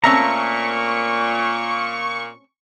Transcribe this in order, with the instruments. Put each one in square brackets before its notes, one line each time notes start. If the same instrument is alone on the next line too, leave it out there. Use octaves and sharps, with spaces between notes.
[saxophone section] A#2 [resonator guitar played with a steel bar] A3 C4 C#4 [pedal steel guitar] E5 A#5 [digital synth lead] C#6